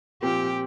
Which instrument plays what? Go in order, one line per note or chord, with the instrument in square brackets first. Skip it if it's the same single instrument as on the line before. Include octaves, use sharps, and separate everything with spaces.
[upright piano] A#2 F3 C4 [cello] G4